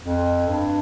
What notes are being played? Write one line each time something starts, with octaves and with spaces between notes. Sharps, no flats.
F2
G2